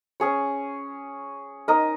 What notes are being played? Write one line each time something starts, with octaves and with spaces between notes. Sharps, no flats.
C#4 G#4 C#5
D#4 A#4 D#5